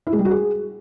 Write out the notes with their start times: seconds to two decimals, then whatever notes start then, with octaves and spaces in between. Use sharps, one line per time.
0.07 E4
0.13 G#3
0.19 G3
0.25 F#4
0.31 G#4